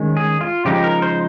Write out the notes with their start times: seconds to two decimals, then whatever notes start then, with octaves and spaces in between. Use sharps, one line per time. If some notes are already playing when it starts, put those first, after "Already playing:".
Already playing: D#3 G#3 C#4
0.17 G#4
0.41 F4
0.65 C#3 F3 G#3 D#4 G4
0.84 A#4
1.02 C5